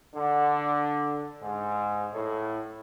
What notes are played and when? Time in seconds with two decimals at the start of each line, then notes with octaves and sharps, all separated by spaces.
0.14 D3
1.42 G#2
2.13 A2